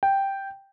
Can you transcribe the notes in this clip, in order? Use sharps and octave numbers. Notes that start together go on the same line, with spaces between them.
G5